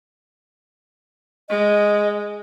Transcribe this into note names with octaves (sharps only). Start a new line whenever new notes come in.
G#3 D#5